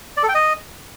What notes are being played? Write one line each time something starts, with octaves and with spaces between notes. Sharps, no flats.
D5
A4
G5
D#5